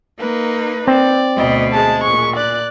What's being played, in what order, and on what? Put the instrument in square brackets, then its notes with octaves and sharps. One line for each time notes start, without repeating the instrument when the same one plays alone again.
[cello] A#3 D#4 [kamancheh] B4
[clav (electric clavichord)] C4 [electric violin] D5
[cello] D2 B2 [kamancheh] D#5
[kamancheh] G#3 G#4 [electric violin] A5
[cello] A#2 [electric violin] C#6
[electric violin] D5 [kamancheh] F#6